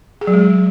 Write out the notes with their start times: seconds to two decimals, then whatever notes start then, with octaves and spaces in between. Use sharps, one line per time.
0.21 G#4
0.27 F#3
0.33 G#3